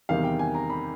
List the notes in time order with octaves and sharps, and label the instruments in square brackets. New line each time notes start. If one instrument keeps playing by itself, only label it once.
[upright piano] E2 C3 D#3 G3 F5
G5
G#5
A#5
B5